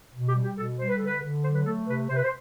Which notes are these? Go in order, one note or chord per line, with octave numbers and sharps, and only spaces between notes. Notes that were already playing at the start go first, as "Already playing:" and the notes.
B2
G4
G3
G4
B2 A4
G3 C5
B4
D3 A4
B4
D3
F#3 C5
B4
A3 A4
C3 B4
C3 C5
B4
C5